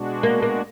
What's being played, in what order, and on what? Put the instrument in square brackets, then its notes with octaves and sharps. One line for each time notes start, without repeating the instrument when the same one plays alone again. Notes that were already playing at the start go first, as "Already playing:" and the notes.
Already playing: [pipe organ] B2 G#3 D4 F#4
[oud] A#3
A#3